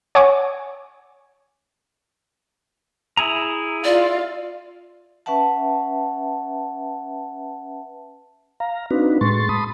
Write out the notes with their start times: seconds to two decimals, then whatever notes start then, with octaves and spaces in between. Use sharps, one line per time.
0.15 C#5 F#5 G#5 C#6 D6
3.17 E4 G#4 A#5
3.84 F4 D5
5.26 C#4 B4 E5 F#5 A5
8.60 F5 A#5
8.91 C4 D4 D#4 F#4 B4
9.21 A2 G#3 C6 C#6 A6
9.49 A5 B5 C6 D#6